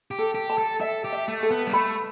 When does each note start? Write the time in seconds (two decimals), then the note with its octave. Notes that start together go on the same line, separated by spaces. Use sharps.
0.11 G4
0.19 A4
0.35 G4
0.50 A5
0.58 A4
0.80 A4 E5
1.04 G4
1.13 E5
1.28 A3
1.43 A4
1.51 B3
1.67 G3
1.73 A3 B5